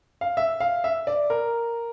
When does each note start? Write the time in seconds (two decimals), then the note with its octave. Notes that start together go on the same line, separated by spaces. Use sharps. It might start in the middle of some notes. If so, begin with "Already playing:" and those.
0.21 F5
0.37 E5
0.60 F5
0.84 E5
1.07 D5
1.30 A#4